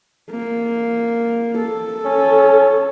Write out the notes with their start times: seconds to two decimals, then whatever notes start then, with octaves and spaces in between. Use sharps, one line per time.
0.31 A#3
1.58 A4
2.05 C#4